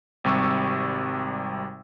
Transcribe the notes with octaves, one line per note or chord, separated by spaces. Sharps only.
G#1 C3 G3 C#6 E6